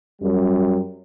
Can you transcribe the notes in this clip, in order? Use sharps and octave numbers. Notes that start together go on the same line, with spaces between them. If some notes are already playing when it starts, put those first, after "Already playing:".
F#2 G3